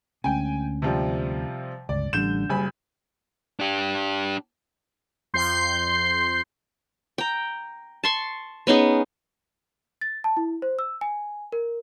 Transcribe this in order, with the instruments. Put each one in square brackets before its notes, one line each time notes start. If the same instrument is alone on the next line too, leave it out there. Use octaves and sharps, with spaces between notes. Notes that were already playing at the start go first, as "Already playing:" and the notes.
[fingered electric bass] D2 G#3 C#4 [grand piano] G5 G#5
[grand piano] C3 F3 G3
[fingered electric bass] G1 C#2 [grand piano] D5
[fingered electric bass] A1 G3 [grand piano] D3 G6 E7
[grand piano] F#1 G#5 B5 [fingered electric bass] G3
[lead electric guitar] D4 G4
[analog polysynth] F2 C6 G6 C7
[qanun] G5 A#5
A5 C6 C#6
B3 C#4 D#4 G#4
[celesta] A6
A5
E4
C5
E6
G#5
A#4